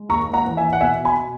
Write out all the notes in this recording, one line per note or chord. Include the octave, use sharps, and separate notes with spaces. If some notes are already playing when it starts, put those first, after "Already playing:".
Already playing: G#3
D#2 A#5 C#6
F#5 A#5
E3
E5 G#5
F#5
B2 E5 G#5
G#5 B5